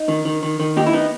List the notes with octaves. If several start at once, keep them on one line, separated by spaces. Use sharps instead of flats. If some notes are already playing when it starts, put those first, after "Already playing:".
Already playing: D#4
D#3
D#3
D#3
D#3
D#2 D#4 G4
E4
B3 D#4